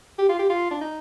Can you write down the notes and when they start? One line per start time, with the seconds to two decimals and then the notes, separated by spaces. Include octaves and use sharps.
0.19 G4
0.29 F4
0.39 G4
0.50 F4
0.71 D4
0.81 D#4